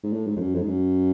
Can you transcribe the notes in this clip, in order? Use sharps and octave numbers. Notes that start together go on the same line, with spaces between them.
G#2
A2
G#2
F2
F#2
F2
G#2
F#2